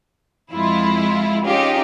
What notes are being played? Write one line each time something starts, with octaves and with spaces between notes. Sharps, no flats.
F2 G#3 E4 F4
C#4 D#4 F4 G4 G#4 D#5